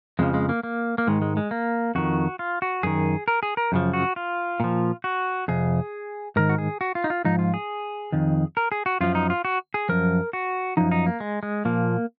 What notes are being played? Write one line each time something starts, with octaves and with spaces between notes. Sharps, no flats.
F2 C#3 F3 G#3
G#3
A#3
A#3
A#3
G#2 D#3 G#3
G#3
G#3
A#3
F2 D#3 F#4
F4
F#4
F#2 D#3 G#4
A#4
G#4
A#4
F#2 C#3 F3
F#4
F4
A#2 F3
F#4
F2 C3 G#4
G#2 D#3 A#4
F#4
G#4
F#4
F4
D#4
F4
G#2 F3 D#4
F4
G#4
F2 D#3
A#4
G#4
F#4
F#2 F3 F4
D#4
F4
F#4
G#4
F#2 F3 A#4
F#4
F#2 F3 D#4
D#4
A#3
G#3
G#3
A#2 F3 A#3